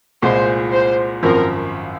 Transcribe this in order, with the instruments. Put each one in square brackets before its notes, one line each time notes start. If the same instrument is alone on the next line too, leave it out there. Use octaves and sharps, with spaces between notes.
[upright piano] C2 A#2 G#3 [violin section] C5
[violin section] C5
[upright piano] G#1 F#2 F3 C4 [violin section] A#4